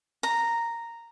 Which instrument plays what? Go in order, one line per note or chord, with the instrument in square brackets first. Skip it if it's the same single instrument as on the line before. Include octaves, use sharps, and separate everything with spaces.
[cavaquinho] A#5